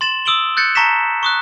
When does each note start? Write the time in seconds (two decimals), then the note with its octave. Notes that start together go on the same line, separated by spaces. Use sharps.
0.01 C6 A6 E7 F#7
0.26 D#6 E6 D7 F#7 G7
0.57 F#6 G6 A6 C#7
0.75 A5 A#5 C#6 A#6 B6 E7
1.23 C#6 D#6 F#6